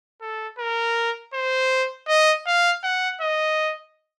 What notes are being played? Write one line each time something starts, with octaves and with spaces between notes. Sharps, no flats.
A4
A#4
C5
D#5
F5
F#5
D#5